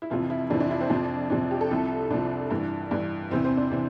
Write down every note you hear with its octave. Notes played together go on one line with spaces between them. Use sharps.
E4
F2 C3 E3 F4
E4
F2 C3 E3 D4
D4
E4
C4
F2 C3 F3 D4
F2 C3 F3 D4
G4
A4
C2 C3 F3
C2 C3 F3 D4
G2 E3
G2 E3
E2 C3 E3 C4
C4
D4
C3 E3